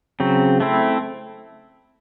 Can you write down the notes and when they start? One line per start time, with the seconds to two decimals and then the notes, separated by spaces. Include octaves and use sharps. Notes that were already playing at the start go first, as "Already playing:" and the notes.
0.20 C#3 F#3 C4
0.60 A3 C4 E4